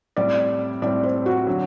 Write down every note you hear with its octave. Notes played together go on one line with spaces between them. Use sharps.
A2 G3 C4 D5
A2 G3 C4 D5
C5
F#4
D3 F#3